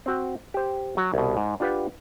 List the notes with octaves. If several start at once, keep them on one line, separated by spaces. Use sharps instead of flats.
C4 F#4 G5
G4 C5
F#3 F#4
C2 B2
G#2
D4 F4 G4 B4 F5 F#5